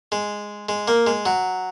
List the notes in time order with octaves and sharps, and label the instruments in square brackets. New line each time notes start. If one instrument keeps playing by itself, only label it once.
[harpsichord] G#3
G#3
A#3
G#3
F#3